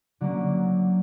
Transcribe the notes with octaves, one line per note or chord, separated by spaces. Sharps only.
D3 F#3 A#3 C#4